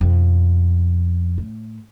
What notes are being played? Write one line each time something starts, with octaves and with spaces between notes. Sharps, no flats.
F2 B2
A2